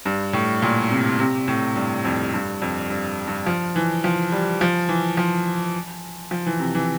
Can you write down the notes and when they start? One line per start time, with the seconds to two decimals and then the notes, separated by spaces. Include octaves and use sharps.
0.05 G2
0.33 A2
0.62 A#2
0.91 C3
1.19 C3
1.48 A2
1.76 G2
2.05 F2
2.34 G2
2.62 F2
2.90 G2
3.27 G2
3.46 F3
3.76 E3
4.04 F3
4.32 G3
4.61 F3
4.89 E3
5.17 F3
6.31 F3
6.46 E3
6.60 C3
6.75 E3